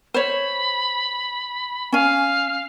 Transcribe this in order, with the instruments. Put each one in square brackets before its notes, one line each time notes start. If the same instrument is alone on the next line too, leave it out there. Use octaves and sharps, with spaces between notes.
[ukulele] C5 C#5 [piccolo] B5
[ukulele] C#4 G#5 [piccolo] F5